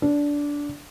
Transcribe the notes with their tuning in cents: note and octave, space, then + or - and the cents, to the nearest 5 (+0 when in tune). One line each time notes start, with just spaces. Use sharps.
D4 -15